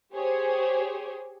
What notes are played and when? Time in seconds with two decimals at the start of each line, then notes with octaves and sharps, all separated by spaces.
0.14 G4 G#4 C5 C#5